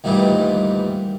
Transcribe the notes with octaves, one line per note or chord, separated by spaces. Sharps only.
D2 G2 A#2 D#3 E3 G3